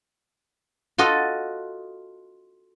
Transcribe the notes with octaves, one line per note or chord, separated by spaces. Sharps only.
F4 F#4 A4 D#5